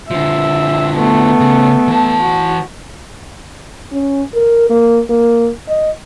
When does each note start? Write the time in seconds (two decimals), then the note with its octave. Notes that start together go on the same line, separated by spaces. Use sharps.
0.11 D3 F3 E5
0.96 A3 B3
1.40 C#3
1.88 E3 A5
2.20 F#4
3.92 C#4
4.34 A#4
4.70 A#3
5.09 A#3
5.68 D#5